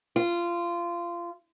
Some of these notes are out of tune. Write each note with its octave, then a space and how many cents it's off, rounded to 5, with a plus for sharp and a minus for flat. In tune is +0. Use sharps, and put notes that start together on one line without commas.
F4 -20